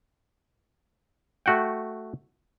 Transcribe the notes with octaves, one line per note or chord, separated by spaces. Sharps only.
A3 F#4 F#5 G5